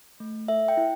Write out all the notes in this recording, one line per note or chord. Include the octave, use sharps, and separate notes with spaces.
A3
A4 E5
G5
E4